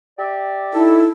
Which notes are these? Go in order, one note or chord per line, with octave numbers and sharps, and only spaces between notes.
G4 D5 E5
D#4 E4 A4